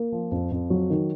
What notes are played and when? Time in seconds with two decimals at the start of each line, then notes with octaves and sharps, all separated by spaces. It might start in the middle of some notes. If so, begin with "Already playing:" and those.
Already playing: A#3
0.12 F3
0.32 F2
0.51 F2
0.70 F#3
0.90 D#3